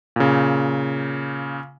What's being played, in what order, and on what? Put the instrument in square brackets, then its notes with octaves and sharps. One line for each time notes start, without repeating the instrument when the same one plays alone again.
[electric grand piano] A#2 C#3